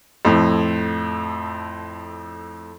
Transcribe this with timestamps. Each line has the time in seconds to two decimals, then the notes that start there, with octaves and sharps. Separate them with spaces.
0.25 F2 A2